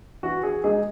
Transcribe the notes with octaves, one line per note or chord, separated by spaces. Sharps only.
E3 F#4
G#4
G#3 D#4 G#4